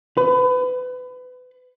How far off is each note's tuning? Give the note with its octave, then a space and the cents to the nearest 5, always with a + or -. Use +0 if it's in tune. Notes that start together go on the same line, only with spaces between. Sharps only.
B4 +30